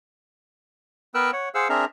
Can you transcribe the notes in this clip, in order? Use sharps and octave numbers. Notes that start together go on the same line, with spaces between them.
B3 A#4 B4 G5 E6 F#6
C#5 F#5
G#4 C5 F5 F#5 E6
C4 D4 G#4 A#4 E5 A#5